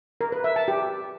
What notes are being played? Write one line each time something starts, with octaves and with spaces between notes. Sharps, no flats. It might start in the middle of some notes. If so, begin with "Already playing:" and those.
A#4
B4
E5
A5
G4